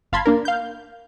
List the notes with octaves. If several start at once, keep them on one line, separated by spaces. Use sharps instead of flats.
G1 F5 A5 B5 C6 G#6
A#3 D4 A#4
F5 G6